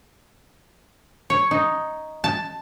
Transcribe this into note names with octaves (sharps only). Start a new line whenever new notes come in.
C#5
D#4
A5